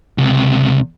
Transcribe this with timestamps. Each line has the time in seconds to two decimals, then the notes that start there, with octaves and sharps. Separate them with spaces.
0.18 C#2 C3